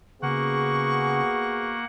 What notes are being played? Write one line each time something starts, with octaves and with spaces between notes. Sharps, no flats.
C#3 A#3 B3 F#4 G#4 F#5 C#6